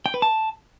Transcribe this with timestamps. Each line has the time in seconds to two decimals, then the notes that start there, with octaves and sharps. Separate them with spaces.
0.06 G5
0.14 B4
0.22 A5